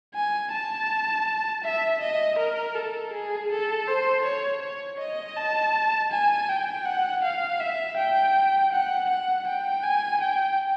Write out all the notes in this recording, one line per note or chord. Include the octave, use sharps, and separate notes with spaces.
G#5
A5
E5
D#5
A#4
A4
G#4
A4
C5
C#5
C#5
D#5
A5
G#5
G5
F#5
F5
E5
G5
F#5
F#5
G5
G#5
G5